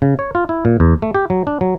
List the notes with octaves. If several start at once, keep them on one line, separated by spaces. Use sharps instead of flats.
C#3
C#5
F4
E4
A#2
E2
A3
G4
F#3
D4
F#3